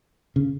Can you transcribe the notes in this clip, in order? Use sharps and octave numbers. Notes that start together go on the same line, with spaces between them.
C#3